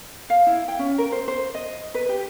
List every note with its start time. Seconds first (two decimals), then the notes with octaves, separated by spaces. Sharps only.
0.30 F5
0.47 E4
0.68 G5
0.79 C#4
0.98 A#4
1.12 C5
1.28 C5
1.55 D#5
1.95 B4
2.09 G4